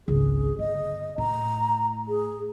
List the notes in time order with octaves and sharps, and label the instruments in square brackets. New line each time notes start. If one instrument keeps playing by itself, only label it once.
[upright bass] G#1 C#2 [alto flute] G#4
[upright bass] G1 [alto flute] D#5
[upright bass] A2 [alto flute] A#5
[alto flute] G#4